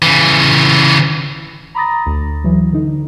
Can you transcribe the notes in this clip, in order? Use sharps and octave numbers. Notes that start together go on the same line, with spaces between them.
C#3 E3
A#5 B5 D6 D#6 A6 A#6
D2
E3 F#3
D3 D#4